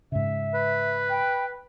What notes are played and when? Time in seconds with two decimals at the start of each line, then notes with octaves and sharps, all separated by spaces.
0.12 G#2 C#3 E5
0.54 B4
1.10 G5